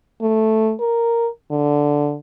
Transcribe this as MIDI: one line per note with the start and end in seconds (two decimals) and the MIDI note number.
0.22 0.73 57
0.80 1.28 70
1.51 2.16 50